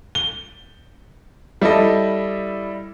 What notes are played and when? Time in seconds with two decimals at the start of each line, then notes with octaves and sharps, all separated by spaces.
0.15 G7
1.61 G3 E4 A4 D#5